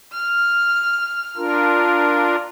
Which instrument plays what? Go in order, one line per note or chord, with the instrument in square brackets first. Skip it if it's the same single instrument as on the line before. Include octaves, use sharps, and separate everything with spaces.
[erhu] F6
[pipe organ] D4 F4 A#4